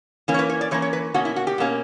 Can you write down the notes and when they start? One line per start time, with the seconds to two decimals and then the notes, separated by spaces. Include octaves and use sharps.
0.28 E3 A#3 C#4
0.34 C#5
0.39 B4
0.50 C#5
0.61 D5
0.71 E3 A#3 C#4 C#5
0.82 C#5
0.93 B4
1.14 B2 A#3 C#4 F#4
1.25 E4
1.36 F#4
1.47 G4
1.58 B2 A#3 C#4